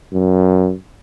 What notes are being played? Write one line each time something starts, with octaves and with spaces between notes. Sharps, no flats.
F#2